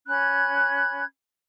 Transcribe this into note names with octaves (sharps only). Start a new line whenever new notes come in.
C#4 B5 F#6 G#6